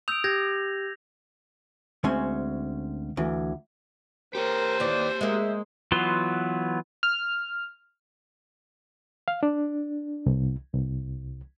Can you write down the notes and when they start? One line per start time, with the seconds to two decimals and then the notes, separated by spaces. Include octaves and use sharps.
0.08 D#6 E6 G6 D7 F7
0.24 G4 G6 G#6 A#6
2.04 D2 G#3 C4 C#4 G#5
3.17 D2 E3
4.35 G4 A#4 C5 C#5
4.80 D#2 E3 D5
5.21 G#3 A#3 E5
5.92 E3 F#3 B3 F4 C6
7.03 F6
9.28 F5
9.43 D4
10.26 C2
10.73 C2